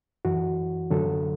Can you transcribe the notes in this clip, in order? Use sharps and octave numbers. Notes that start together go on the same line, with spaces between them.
F#2 E3 F#4
F#2 D3 F#3 A4